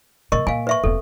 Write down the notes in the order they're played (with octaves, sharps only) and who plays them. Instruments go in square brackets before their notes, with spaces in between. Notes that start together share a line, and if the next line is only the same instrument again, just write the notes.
[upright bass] A#2 F3 [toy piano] A#4 D#5 C#6
[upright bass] A#2 [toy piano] F5 G#5
[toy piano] B4 E5 C#6
[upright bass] E1 C4 [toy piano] A4